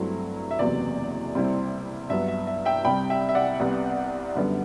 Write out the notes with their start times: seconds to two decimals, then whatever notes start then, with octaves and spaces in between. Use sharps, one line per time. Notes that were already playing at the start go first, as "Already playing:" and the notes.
Already playing: G2 F#3 A3 C4 E4
0.51 E5
0.59 F#1 E2 C3 F#3 B3 D5
1.35 C2 C3 G3 C4 E4
2.09 G2 F#3 B3 E5
2.28 E5
2.47 E5
2.65 E5 G5
2.85 C2 C3 G3 G5 B5
3.10 E5 G5
3.29 E5
3.35 D5 F#5
3.60 C2 C3 G3 B3
4.35 F#2 D3 G3 B3